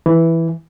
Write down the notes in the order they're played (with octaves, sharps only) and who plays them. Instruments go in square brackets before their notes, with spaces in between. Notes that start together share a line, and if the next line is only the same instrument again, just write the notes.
[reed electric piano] E3